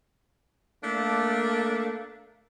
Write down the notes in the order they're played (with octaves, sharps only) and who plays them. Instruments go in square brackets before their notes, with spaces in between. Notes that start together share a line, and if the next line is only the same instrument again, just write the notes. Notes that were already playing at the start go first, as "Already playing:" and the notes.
[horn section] A3 A#3 D4